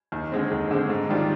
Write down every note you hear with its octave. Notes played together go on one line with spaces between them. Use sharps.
D#2
D3 G#3 C4
D#2
D3 G#3 C4
G#2
D#3 G3 D4 F4